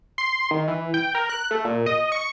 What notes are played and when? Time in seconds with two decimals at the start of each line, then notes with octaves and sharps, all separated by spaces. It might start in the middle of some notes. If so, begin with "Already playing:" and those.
0.18 C6
0.51 D#3
0.68 E3
0.94 G5
1.15 A#4
1.29 F#6
1.51 A3
1.65 A#2
1.86 D#5
2.12 C#6